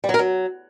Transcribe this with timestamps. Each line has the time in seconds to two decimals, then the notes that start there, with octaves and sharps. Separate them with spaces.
0.04 G3
0.09 F#3
0.14 A#4
0.19 F#3